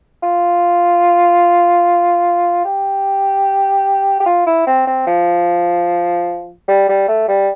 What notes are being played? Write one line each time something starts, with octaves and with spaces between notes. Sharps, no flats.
F4
G4
G4
F4
E4
C4
C4
F3
G3
G3
A3
G3